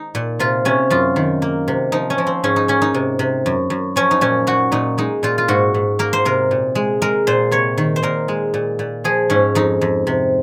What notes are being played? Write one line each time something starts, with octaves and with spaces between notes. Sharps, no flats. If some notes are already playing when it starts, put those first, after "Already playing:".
Already playing: D#4
A#2
C3 F4
C3 C#4
F#2 F4
D#3
A#3
C3
F3 D#4
C#4
F3
C4
G#2 C#4
D#4
A#3 C#4
D#4
C3
C3
F#2
F#2
F3 C#4
D#4
A#2 C#4
A#2 F#4
A#2 D#4
G#3 D#4
A#2 F4
F4
G#2 F#4
G#2
A#3 A#4
C5
C3 A#4
A#2
G#3
G#3 A#4
A#2 C5
C3 C#5
D#3
C5
A#2 A#4
G#3
A#2
A#2
F3 G#4
G#2 C#4
F2 D#4
F2
C3